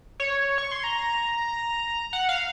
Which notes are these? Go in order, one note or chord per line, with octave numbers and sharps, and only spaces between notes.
C#5
C#6
C6
A#5
F#5
F5